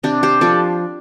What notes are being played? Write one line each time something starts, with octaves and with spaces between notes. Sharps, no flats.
C3 D4 G4
G4 C5
F3 D4 A4 D5